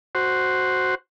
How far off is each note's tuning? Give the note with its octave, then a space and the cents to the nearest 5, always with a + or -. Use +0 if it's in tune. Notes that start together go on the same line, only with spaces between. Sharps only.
F#4 +0 C5 +0